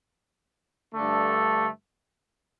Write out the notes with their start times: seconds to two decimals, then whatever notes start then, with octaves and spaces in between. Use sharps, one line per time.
0.93 G2 D3 A3